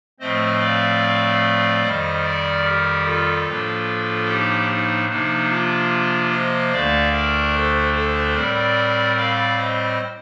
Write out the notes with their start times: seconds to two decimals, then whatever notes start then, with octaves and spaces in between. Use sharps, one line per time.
0.20 A2 F3 A3 C4 C5 D#5
0.60 D5 F5
1.83 F2 D#3 G3 C5 D#5
2.24 A#4 D5
2.64 G4 A#4
3.05 F4 A4
3.46 A2 F3 A#3 D4
4.27 D#4 G4
4.68 D#4
5.09 C3 F3 A#3 D4 D#4
5.49 D4 F4
6.31 C5 D#5
6.72 D2 D3 A3 D4 D5 F5
7.12 A#4 D5
7.53 A4 C5
7.94 A4 C5
8.35 A2 G3 C4 A#4 D5
9.16 D5 F5
9.57 C5 D#5